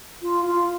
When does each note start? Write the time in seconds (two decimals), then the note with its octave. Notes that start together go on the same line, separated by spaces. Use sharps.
0.22 F4
0.45 F4